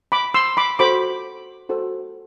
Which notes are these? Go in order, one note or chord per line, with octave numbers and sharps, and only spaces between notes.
B5 D6
C6 E6
B5 D6
F#4 A4 C5 B5 D6
F#4 A4 C5